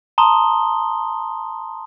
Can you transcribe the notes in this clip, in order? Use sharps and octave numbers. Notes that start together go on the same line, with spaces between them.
A5 A#5 C6 D#6 G7